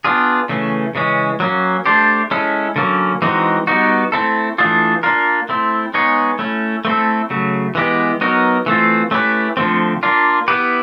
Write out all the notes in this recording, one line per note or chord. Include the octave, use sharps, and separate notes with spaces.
B3 D4 F4 G#4
C#3 E3 A3 C#4
C#3 E3 G#3 C#4
F#3 A#3 C#4
A3 D4 G4 C5
G#3 C#4 E4 A4
D3 F#3 A#3 C#4
E3 G#3 C4 D#4 F#4
G3 B3 D#4 F#4
A3 C4 E4 A4
E3 A3 D4 F4 G#4
A#3 D4 F4 A#4
A3 C4 E4
G#3 B3 D#4 G#4 C#5
A3 C#4 E4
A3 C4 E4 A4
C#3 F#3 A3
E3 G#3 B3 E4 G4
F#3 B3 D#4 F#4 A#4
E3 A3 C4 F4
A3 C#4 E4 G4 B4
D3 F3 A3 C4
A#3 D4 F4
B3 E4 G4 B4